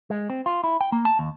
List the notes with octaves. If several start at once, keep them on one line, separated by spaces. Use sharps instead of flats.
G#3
C4
F4
E4
G5
A#3
A5
D#2